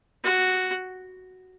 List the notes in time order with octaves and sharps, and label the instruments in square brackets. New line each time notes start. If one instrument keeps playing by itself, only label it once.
[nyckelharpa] F#4